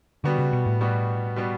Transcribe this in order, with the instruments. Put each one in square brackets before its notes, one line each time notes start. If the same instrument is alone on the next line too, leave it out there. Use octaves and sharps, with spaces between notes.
[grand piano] B2 G3 B3 F#4 [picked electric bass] D3
[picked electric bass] C#3
B2
A2
[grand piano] B2 G3 B3 F#4
B2 G3 B3 F#4